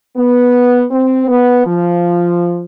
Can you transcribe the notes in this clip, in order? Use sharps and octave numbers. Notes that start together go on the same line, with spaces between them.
B3
C4
B3
F3